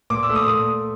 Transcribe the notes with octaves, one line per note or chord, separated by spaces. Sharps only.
A#2 D6
E6
A3
D#6
A#2 D#6